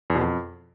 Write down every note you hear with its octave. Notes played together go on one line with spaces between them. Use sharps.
E2
B2
F2